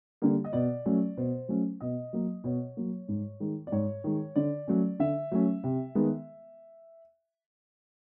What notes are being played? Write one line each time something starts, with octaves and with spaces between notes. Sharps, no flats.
D3 G3 A#3
D#5
B2 D5
F#3 A3 C#4
B2 C5
F#3 A3 C#4
B2 D#5
F#3 A#3
B2 C#5
F#3 A#3
G#2
D#3 G#3
D5
G#2 C#5
D#3 G#3
D3 D5
F#3 A3 C#4
D3 E5
F#3 A3 C#4
C3
D#3 G#3 B3